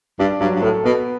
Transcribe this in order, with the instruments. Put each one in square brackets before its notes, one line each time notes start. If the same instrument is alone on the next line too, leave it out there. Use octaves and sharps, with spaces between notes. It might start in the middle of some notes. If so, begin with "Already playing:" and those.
[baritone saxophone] G2 [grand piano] D4
[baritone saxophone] G2 [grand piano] F#3
[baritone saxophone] G2
[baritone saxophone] A2 [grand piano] A4
[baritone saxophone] B2 [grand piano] B3